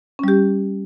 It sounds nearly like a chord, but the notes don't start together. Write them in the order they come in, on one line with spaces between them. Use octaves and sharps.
C#4 G3 G4